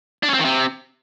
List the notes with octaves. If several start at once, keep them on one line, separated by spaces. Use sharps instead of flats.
D4
C#4
C4
D#3
C3